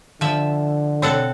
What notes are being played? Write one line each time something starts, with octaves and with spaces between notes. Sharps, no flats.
D3 F3 E5
B2 C4 A4 C#5 F#5 E6